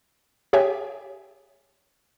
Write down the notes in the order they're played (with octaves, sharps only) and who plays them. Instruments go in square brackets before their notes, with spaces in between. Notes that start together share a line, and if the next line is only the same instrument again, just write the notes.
[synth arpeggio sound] G4 G#4 C#5 E5 G5 G#5